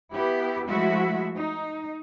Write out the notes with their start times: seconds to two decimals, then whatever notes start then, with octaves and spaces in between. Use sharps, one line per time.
0.13 B3 E4 G4
0.68 F3 G#3 A3 E4 F#4 E5
1.35 D#4